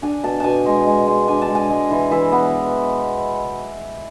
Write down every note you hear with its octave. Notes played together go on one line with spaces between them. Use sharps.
D4 G#5
B2 A5
B2 G#5 A5
G#3
G#3
G#3
D4 G#5
A5
G#3
G#5
G#3
E3
E3 E5
B3